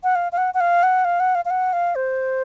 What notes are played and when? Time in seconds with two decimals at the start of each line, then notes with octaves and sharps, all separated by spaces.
0.03 F#5
0.15 F5
0.32 F5
0.37 F#5
0.54 F#5
0.60 F5
0.83 F#5
1.05 F5
1.20 F#5
1.35 F5
1.45 F5
1.50 F#5
1.73 F5
1.95 C5